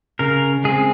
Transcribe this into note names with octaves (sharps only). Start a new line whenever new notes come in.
C#3 A#4
G#3 C4 G#4